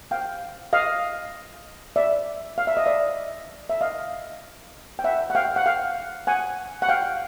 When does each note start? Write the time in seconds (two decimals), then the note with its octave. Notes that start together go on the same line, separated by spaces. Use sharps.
0.11 F5 G5
0.73 D#5 F5
1.96 D5 E5
2.58 F5
2.67 E5
2.77 D#5
2.86 D5 E5
3.70 E5
3.81 D#5 F5
4.99 G5
5.04 E5 F#5
5.30 F#5
5.35 F5 G5
5.56 F#5
5.66 F5 G5
6.27 F#5 G#5
6.82 F#5
6.89 F5 G5